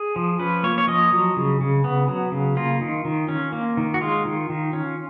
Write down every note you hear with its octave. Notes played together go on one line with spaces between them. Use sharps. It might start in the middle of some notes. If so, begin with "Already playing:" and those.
Already playing: G#4
F3
C#4 B4
A#3 C#5
C#5
F3 D#5
F#3
C#3
C#3
B3
F#3
C#3
A#3 F4
D#3
D#3
C#4
A#3
D#3
F#4
G#3 F4
D#3
D#3
C#4